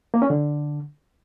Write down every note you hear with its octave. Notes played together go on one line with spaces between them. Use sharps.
A#3
C#4
D3